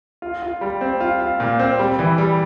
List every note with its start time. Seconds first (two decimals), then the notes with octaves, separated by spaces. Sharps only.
0.22 F4
0.42 F4
0.61 G3
0.81 C4
1.00 F4
1.20 F4
1.40 A#2
1.59 C4
1.79 G3
1.99 E3
2.18 G3